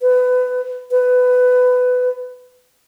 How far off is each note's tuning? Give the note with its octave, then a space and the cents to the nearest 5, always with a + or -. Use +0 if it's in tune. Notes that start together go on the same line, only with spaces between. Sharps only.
B4 +25
B4 +20